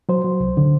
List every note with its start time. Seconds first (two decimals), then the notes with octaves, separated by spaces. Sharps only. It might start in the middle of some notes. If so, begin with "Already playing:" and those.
0.09 F#3 C5
0.24 F#3
0.40 C2
0.57 D3